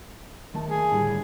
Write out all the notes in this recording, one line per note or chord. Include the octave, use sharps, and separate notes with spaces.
D#3 A3 A5
G#4
A2 D3 G3